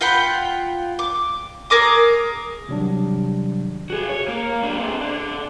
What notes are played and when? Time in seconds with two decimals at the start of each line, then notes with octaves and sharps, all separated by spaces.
0.01 F4 F#5 G5 B5
0.99 D6
1.70 G#4 A#4 D6 D#6
2.69 C3 D#3 F#3 G3 D4
3.90 F#4 G#4
4.09 C#5
4.28 A#3
4.62 F#3 D4
4.77 A#2 C4
5.01 D3 D4